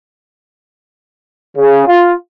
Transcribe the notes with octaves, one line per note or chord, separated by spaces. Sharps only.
C#3
F4